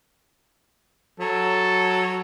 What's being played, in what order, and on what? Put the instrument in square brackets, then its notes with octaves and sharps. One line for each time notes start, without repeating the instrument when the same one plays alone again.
[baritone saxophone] F#3 [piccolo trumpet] A4